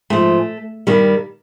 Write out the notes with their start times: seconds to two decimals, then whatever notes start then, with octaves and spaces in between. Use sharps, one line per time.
0.10 G#2 F3 A3
0.87 G2 D#3 G3